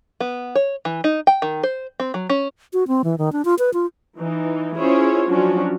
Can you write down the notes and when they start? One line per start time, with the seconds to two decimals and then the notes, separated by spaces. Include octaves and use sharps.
0.20 B3
0.55 C#5
0.85 E3
1.04 D#4
1.27 G5
1.42 D#3
1.63 C5
2.00 C4
2.14 F#3
2.30 C#4
2.73 F#4
2.88 C4
3.04 E3
3.18 D#3
3.32 D4
3.45 F4
3.59 B4
3.74 F4
4.17 E3 D#4
4.77 C#4 E4 F4 G#4 C5 C#5
5.29 F3 F#3 C#4 D4 F#4